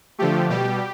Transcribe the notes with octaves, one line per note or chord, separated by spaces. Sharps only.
D3 F3 A3 G4
B2 G3 G4